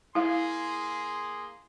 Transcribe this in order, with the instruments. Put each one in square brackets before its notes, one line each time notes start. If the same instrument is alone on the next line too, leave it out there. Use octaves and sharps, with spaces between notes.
[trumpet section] A#3 G#4 C6 [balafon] E4 F5